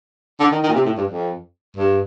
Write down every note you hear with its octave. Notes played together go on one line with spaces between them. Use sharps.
D3
D#3
D#3
A#2
C3
A2
G2
F2
G2